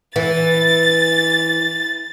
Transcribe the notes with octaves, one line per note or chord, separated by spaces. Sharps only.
E3 A6